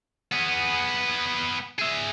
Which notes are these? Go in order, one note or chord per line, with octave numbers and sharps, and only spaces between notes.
B3 G#4
G#4 E5